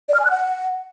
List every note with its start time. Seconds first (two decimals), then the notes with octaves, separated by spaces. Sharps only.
0.09 D5
0.14 F6
0.20 G#5
0.25 F#6
0.30 F#5